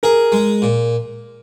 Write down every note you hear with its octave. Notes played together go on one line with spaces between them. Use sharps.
G#4 A#4
G#3
A#2